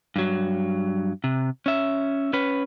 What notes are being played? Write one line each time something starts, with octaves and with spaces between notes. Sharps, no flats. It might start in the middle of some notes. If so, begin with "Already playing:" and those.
G2 F#3
C3
C#4 E5
C#4 B4